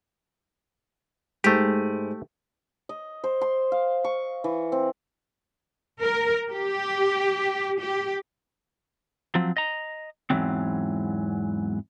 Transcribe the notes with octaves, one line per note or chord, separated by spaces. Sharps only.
G#2 G#3 A3 G4
D#5
C5
C6
F5
C#6
E3
C4
A#4
G4
G4
F3 F#3 C4
D#5 A#5
E2 G#2 E3 F#3 C4